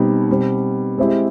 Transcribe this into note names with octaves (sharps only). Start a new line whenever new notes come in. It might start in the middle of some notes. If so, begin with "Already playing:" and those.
Already playing: B2 G3 C4 D#4 G4
B2 G3 C4
G#3 C4 E4 G4